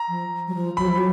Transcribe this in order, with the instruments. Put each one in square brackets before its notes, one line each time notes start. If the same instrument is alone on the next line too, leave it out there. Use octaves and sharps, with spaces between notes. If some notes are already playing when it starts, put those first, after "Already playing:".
Already playing: [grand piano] A#5
[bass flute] F3
F#3
F3
[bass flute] F#3 [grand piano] B5
[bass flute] F3
F#3